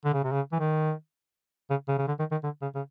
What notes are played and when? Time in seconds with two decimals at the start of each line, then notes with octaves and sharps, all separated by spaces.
0.05 D3
0.14 C#3
0.24 C3
0.32 C#3
0.52 E3
0.59 D#3
1.70 C#3
1.88 C#3
1.98 C#3
2.08 D3
2.19 D#3
2.31 D#3
2.43 D3
2.62 C#3
2.75 C#3